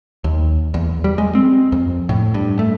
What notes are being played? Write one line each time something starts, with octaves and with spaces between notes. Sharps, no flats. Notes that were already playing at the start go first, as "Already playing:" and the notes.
D#2
E2
G3
G#3
C4
F2
A2
G2
A3